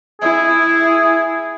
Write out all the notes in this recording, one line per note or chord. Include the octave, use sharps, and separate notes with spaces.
E4 G#4